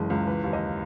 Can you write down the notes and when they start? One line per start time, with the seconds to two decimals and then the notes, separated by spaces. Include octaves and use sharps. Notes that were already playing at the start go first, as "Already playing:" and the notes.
Already playing: F#1 E3 G#3 A5
0.10 C#2
0.27 E3 B4
0.44 D#2
0.53 D#5